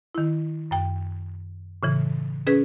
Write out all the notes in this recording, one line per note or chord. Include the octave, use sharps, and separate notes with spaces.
D#3 E4
F#2 G5
A2 C#3 E3
C#4 G#4 B4